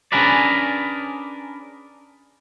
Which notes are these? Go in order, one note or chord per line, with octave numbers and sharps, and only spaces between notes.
C#4 D4 G#4 A#4 B4 D5